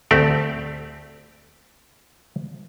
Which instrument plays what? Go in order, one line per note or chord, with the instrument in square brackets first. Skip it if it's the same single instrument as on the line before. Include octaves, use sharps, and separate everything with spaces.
[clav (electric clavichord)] D2 A3 C4 G4 D5